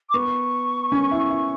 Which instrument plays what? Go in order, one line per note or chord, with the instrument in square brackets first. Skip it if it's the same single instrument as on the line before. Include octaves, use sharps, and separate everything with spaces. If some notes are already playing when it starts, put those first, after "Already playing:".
[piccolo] D6
[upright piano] B3 [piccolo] C#6
[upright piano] C#4
E4
E4